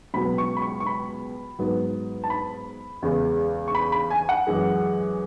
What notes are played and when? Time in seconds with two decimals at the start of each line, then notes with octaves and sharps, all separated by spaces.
0.14 C#2 B2 F#3 B3 B5
0.38 C#6
0.57 B5
0.62 C#6
0.80 C#6
0.87 B5
1.59 G#2 F#3 B3
2.24 A5
2.30 B5
3.02 E2 C#3 G#3 B3
3.68 C#6
3.75 B5
3.92 B5
4.10 G#5
4.29 F#5
4.47 F#2 E3 G#3